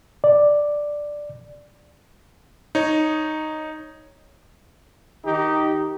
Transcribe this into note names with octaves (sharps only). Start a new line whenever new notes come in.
D5
D#4 C#5
D#3 D#4 G4